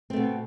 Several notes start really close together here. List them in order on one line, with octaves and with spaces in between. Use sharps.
C4 A3 B2